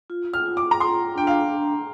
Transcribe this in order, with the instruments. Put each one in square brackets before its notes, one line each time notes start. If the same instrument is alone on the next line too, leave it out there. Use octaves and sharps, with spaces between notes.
[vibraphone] F4
[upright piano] F6
[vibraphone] F4
[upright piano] D6
A#5
[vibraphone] F4 [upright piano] C6
[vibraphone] D4 [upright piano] G5
[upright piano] F5